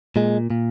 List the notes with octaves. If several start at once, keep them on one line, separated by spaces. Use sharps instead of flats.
A#2 G#3
A#2